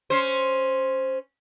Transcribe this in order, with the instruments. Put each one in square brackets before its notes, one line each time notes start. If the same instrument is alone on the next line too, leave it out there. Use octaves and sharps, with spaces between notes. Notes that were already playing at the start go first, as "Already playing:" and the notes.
[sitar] C#4 C5